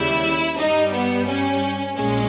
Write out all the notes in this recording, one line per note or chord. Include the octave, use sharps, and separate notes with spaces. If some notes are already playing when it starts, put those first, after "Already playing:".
Already playing: D#2 C#3 G3 E4
G2 G3 D#4
B3
C#4
A#1 A#2 G#3 C#4